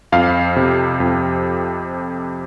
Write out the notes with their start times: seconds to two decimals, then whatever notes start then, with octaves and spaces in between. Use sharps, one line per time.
0.12 F2 F5
0.56 C3
1.00 F2